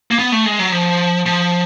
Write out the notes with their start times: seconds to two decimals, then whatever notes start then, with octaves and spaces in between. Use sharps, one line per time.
0.11 A#3
0.19 B3
0.32 A3
0.46 G#3
0.59 F#3
0.72 F3
1.26 F3